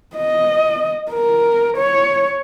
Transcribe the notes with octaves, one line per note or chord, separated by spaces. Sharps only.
D#5
A#4
C#5